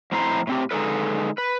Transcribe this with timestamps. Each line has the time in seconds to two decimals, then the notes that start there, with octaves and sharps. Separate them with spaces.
0.12 F2 A2 C4 E4 C5 A#5
0.47 A2 C4 G4
0.71 D3 G#3 D#4 A4 B4
1.38 B4